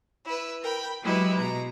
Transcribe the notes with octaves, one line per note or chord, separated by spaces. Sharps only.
E4 B4
A#4 G5 B5
F#3 G#3 E4 G4 B4
B2 A#5